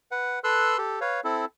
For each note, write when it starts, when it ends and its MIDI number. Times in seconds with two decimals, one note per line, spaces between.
0.11 0.39 71
0.11 0.39 78
0.44 0.77 69
0.44 0.77 71
0.44 0.77 84
0.44 0.77 88
0.44 0.77 90
0.78 1.00 67
0.78 1.00 69
1.01 1.20 71
1.01 1.20 73
1.01 1.20 77
1.24 1.45 60
1.24 1.45 64
1.24 1.45 69